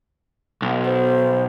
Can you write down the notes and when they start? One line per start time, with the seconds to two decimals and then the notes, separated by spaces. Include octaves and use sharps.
0.62 B1
0.85 C5